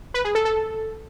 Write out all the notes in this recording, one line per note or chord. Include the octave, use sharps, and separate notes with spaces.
B4
G#4
A4
A4